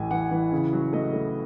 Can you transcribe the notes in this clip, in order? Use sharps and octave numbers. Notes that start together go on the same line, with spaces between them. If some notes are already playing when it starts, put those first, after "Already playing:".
Already playing: A1 A2 G#5
E3 F#5
E3
C#3
F#3
A3 D#5
A3